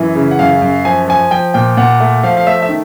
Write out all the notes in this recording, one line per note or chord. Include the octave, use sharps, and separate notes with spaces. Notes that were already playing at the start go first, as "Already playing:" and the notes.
Already playing: F#2 E3
C#3
F#5
F#2 F5
F#2
F3 G#5
F3 G#5
F3 G5
A#2 G5
A#2 F#5
A3
F3 F5
F5
A3 E5
E5
D#3